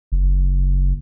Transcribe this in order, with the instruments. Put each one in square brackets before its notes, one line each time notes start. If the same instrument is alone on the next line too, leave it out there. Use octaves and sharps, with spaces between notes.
[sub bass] F#1